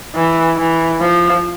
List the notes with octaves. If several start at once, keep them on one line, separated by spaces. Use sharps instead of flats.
E3
E3
F3